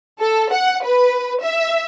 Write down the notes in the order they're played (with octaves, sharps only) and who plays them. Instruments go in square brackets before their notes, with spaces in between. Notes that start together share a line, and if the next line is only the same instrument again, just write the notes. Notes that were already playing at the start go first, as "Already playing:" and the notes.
[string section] A4
F#5
B4
E5